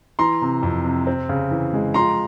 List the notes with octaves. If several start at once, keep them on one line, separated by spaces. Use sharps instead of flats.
E3 A#5 C6
C3
F2
C3
C4
C#3
E3
G#3
F3 A#5 C6